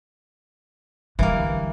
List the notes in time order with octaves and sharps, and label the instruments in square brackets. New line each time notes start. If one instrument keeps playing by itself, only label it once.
[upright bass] D3 G3 [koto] E3 A#3